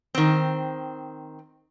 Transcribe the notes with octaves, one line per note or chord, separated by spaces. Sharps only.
D#3 C4